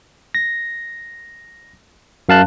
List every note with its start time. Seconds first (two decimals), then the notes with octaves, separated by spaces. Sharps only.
0.35 A#6
2.29 F#2 F5 A5 F#6